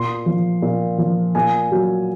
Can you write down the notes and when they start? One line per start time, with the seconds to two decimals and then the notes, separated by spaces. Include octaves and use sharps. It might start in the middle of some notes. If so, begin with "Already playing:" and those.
Already playing: A#2 C6
0.26 F3
0.62 A#2
0.98 F3
1.35 A#2 G#5
1.71 F#3